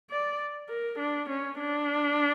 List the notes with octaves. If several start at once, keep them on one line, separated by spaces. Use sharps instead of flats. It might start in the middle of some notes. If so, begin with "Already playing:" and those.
D5
A#4
D4
C#4
D4